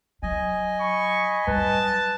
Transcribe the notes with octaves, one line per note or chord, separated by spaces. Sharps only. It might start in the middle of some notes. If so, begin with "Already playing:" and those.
F#3 D#5 G#5
B5 C#6
F#3 G3 B4 A5